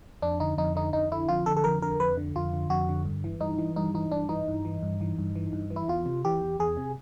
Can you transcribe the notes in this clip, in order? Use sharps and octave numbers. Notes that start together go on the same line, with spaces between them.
F2 D4
D3 D#4
F2 D#4
D3 D#4
F2 D#4
D3 E4
F2 F4
D3 A4
A4
F2 A#4
D3 A#4
F2 B4
D3
F2 F4
D3
F2 F#4
D3
G2
E3
G2 D#4
E3
G2 D#4
E3 D#4
G2 D4
E3 D#4
G2
E3
G2
E3
G2
E3
G2
E3
E4
E2 F4
C3
E3 G4
E2
E2 G#4
C3